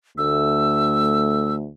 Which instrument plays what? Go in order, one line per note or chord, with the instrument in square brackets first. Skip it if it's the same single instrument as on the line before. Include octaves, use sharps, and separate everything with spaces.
[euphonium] D2 [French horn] A3 [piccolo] E6